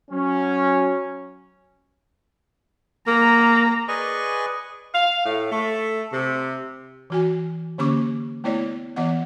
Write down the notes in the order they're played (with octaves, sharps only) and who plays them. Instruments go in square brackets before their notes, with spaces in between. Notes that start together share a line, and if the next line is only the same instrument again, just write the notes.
[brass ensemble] F#3 C#4
[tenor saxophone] A#3 [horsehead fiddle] A#5
[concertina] G#4 B4 D5 D#5 G#5 C#6
[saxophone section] F5
A2
A3
C3
[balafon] E3 F#4 G#5
D3 A#3 C#4 G4 C#6 D6
A3 B3 E4 C#5 D5
E3 B3 D#5 F#5